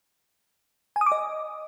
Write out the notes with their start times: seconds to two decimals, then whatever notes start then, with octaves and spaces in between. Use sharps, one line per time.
0.96 G#5
1.01 D#6
1.06 D6
1.12 D#5